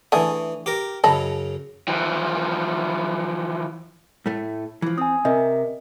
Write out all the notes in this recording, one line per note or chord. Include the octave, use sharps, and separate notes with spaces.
E3 A3 D4 G#4 D#6
G4 A#4
F#2 C#3 D#5 A5 B5
E3 F3
A2 A3
E3 F3
C4 G#5 D#6
C3 A#4 D#5 E5